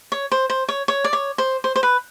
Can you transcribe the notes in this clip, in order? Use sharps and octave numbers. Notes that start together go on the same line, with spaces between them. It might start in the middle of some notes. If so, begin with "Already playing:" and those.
C#5
C5
C5
C#5
C#5
D5
C#5
C5
C5
C5
B4